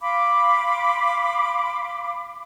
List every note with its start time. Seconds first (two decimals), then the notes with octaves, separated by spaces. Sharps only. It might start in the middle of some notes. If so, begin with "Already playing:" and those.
0.01 F5 B5 C6 D6